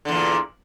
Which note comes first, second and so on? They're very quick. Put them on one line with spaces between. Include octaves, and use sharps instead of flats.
D3 E2 A#2